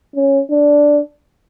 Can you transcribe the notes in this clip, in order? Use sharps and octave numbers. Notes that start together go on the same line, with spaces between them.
C#4
D4